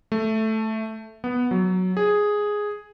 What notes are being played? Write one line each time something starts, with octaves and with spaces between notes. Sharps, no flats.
A3
B3
F#3
G#4